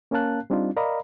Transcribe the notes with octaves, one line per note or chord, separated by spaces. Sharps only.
A#3 C#4 A#4 F5 A5 F#6
G3 C4 D4 D#4 F4
A#4 D5 D#5 F5 A#5 B5